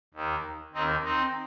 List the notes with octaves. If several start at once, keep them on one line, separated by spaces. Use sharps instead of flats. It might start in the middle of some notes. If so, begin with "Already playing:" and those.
D#2 D#3
D#2 D#3 C4 D#4
C4 D#4